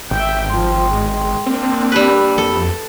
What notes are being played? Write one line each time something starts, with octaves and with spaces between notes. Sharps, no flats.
G#1 E5 G5
F3 G5 C6
G#3
A#3 C4 D4
G3 G4 B4 B5 E6
F2 A4